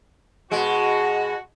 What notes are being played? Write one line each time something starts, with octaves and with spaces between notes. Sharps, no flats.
B2 G#3 F#4